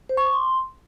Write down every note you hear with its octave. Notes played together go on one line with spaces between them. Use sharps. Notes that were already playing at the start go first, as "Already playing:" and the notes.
C5
C#6
D6
C6